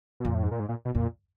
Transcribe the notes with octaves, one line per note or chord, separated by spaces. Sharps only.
B2
F2 A#2
A2
G#2
A#2
G#2
A#2
B2
F2 A#2